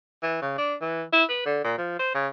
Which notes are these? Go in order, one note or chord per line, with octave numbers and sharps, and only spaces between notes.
E3
C#3
D4
E3
E4
B4
D3
A#2
F3
C5
C#3